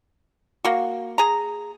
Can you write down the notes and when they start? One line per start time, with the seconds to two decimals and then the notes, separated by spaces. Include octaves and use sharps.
0.65 A#3 F#4
1.18 G#4 A#5